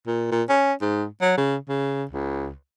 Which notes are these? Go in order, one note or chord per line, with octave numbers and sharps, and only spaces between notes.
A#2
A#2
C#4
G#2
F#3
C#3
C#3
C#2